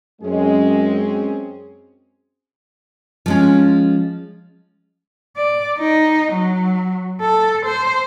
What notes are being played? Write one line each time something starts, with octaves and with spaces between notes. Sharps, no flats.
F#2 G#3 C4 C#4 G#4
F3 G#3 C#4
D5
D#4
F#3
A4
C5